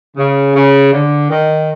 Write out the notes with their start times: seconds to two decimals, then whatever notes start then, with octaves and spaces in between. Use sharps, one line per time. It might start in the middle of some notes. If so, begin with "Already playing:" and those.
0.17 C#3
0.54 C#3
0.92 D3
1.30 D#3